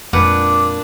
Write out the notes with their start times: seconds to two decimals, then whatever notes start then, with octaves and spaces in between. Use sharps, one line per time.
0.13 F2 A#2 G#3 D4 B4 F#5 D6